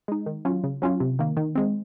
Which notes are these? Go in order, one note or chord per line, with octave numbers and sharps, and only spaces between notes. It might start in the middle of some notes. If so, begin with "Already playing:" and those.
G#3 D#4
D#3
F#3 C#4 F4
C#3
F#3 C#4 F4
C3
D#3 A#3
D#3
G#3 C4